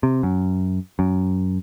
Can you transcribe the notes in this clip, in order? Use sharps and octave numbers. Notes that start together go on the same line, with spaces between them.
C3
F#2
F#2